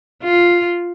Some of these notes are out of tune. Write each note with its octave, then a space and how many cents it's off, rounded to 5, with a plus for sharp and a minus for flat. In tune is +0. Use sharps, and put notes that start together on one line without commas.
F4 +0